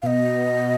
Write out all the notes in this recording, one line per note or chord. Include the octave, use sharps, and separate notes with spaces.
B2 D#5 F5